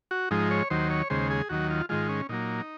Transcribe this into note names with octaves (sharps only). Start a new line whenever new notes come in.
F#4
G#2 F3 G#3 D#4
C#5
D#2 D#3 F#3 C5
C#5
D#2 C#3 G#3 C5
G#4
D#2 D#3 F#3 F#4
F4
G#2 D#3 G#3 F4
C#4
A#2 F#3 A#3 D#4